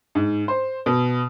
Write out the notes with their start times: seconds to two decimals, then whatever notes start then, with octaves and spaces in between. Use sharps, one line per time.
0.15 G#2
0.48 C5
0.86 B2